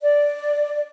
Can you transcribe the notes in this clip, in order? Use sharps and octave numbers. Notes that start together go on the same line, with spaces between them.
D5